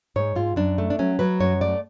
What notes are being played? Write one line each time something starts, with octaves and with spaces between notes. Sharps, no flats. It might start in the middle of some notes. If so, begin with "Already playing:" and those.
G#2 C#5
G#2 F4
F#2 D4
A3
D4
F#3 C#4
F#3 B4
F#2 C#5
A3 D5